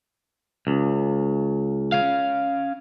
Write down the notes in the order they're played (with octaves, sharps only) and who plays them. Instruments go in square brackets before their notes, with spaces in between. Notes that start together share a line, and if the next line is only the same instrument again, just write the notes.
[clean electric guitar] C#2
[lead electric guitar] C#4 F5